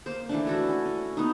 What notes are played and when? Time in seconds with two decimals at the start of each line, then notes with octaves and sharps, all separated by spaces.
0.06 A#3 C5
0.29 E3 A3 D4
0.47 E4 F#4 A4
0.69 C#4
0.85 C#4
1.17 B3 D#4